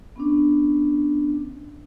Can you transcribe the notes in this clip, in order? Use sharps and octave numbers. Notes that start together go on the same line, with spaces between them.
B3 C#4 D4